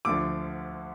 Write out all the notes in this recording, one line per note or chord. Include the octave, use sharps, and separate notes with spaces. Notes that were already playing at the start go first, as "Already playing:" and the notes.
D2 D3 F3 D6